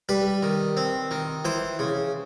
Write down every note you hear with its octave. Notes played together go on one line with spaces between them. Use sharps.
G3 B4
D#3
C4
D#3
E3 C5
C#3